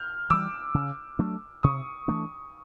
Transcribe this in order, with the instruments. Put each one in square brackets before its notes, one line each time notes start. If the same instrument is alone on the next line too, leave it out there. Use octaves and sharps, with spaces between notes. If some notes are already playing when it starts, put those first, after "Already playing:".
Already playing: [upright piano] F6 G6
[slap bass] E3 G3 [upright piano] D6 E6
[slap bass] C#3
F#3 A3 D4
[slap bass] C3 [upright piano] C#6 D#6
[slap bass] E3 A3 D4